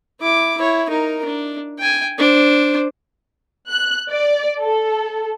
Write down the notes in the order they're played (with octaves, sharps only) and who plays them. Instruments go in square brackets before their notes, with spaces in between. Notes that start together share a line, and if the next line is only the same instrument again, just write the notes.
[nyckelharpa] E4 D6
E4 C#5
D#4 A#4
D4
G5 G#5
D4 C5
[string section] F#6
D5
A4